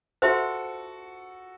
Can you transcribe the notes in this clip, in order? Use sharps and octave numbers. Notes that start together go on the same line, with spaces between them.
F#4 A4 C5 E5 C6